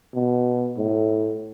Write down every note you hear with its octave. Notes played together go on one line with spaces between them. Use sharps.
B2
A2